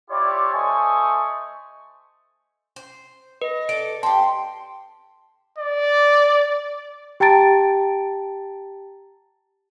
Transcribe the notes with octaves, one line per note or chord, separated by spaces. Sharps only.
E4 F4 G4 C#5 D5
A3 C5 D#5 G#5 C#6
C5
B4 D#5
A4 D5 D7
C4 G4 A5 C6
D5
G4 G5 A5 A#5 A6 D7